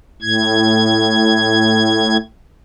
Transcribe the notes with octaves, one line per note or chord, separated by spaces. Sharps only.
A2 G#6